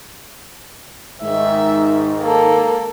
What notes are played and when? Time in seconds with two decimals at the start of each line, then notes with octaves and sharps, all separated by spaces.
1.23 G#2 D#3 E5
2.21 A#3 A4